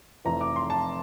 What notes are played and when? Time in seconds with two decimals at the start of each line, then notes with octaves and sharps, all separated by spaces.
0.25 F1 F2 E3 A#5
0.41 D6
0.56 C6
0.70 A5